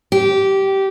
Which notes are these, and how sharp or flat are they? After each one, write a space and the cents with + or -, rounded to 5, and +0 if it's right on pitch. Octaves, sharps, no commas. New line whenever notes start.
G4 -15